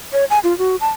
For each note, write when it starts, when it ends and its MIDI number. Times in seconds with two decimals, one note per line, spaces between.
0.13 0.25 73
0.30 0.39 80
0.44 0.56 65
0.58 0.76 66
0.81 0.89 81